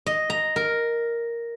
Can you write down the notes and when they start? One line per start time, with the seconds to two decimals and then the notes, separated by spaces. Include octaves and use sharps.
0.06 D#5
0.30 A#5
0.56 A#4